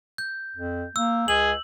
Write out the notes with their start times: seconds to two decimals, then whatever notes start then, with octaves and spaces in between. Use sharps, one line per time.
0.18 G6
0.56 F2
0.96 A#3 E6
1.28 C#2 G#4 F#7